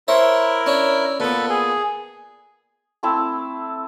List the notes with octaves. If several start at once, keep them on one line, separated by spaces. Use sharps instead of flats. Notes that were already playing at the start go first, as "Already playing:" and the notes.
E4 A#4 C5 C#5 E5
C#4 D4 C#5
A#2 B3 A4 B4
G#4
A3 C4 E4 A5